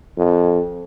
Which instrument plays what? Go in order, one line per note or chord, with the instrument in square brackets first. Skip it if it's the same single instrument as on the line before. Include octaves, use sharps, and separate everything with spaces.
[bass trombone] F2